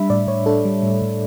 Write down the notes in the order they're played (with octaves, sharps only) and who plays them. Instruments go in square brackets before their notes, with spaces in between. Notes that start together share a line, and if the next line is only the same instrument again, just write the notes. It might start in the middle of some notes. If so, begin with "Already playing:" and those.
Already playing: [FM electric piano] G3 D4 E5 B5
A2 D5
A2 C#5
D4 A4
G3
A2
A2